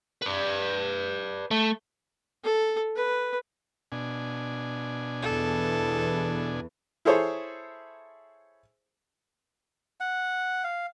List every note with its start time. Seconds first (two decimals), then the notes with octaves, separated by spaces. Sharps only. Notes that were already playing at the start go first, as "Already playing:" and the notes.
0.22 B4 D5
1.51 A3
2.44 A4
2.96 B4
3.92 B2 D4 G#5
5.22 E2 E3 A4
7.05 E4 G#4 A4 C5 C#5
10.00 F#5
10.64 F5